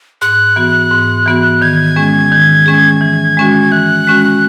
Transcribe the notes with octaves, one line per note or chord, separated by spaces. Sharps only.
G#2 F#6
E3 B3 F#4
G#2
E3 B3 F#4
D#3 G#6
G#3 C#4 G#4
D#3
G#3 C#4 G#4
E3
G#3 C#4 F#4
E3 F#6
G#3 C#4 F#4